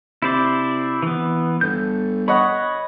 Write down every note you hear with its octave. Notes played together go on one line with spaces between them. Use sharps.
C3 E4 C5 D5
E3 B3
G1 A4 G6
C#5 D#5 F#5 B5